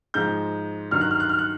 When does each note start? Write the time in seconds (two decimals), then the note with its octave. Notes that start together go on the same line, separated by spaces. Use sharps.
0.14 G#2 F3 G#3 G6
0.91 G2 D#3 F#3 F6
1.01 F#6
1.11 F6
1.20 F#6
1.29 F6
1.39 F#6